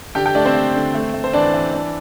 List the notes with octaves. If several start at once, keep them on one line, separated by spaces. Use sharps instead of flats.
D3 G4 G5
G4 G5
A3 D4 D5
C4 C5
A3
D3
A3
A3
C5
E3 D4 D5
E3
D4